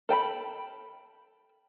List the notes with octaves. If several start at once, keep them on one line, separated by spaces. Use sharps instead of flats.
A4 G5 A5 B5